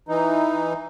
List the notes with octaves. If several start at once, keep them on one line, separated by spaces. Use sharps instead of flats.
E3 D#4